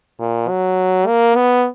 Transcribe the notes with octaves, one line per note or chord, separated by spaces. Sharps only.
A#2
F#3
A#3
B3